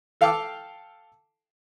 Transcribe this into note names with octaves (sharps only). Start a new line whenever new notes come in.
A4 F5 G5 A5 D6 E6